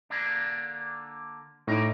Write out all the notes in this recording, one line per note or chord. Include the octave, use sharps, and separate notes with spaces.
D3 A#3 D4
A2 D#4 A#4 D5